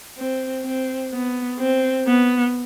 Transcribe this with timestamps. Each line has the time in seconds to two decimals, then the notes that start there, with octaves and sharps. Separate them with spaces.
0.18 C4
0.64 C4
1.13 B3
1.59 C4
2.07 B3